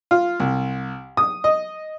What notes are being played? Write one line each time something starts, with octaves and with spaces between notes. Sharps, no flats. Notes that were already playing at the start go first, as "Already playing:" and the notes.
F4
C2
D#6
D#5